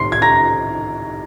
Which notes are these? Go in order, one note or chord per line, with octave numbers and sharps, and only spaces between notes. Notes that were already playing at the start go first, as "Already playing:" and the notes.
Already playing: C2 C3 D#3 C6 C7
G#6
A#5 A#6